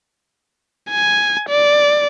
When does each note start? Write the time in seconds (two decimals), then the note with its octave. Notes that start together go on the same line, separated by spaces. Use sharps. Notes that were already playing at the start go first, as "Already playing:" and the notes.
0.90 G#5
1.49 D5